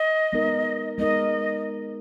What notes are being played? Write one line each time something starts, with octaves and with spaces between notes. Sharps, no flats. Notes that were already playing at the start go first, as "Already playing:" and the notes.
Already playing: D#5
G#3 B3 D#4 A#4
G#3 B3 D#4 A#4 D#5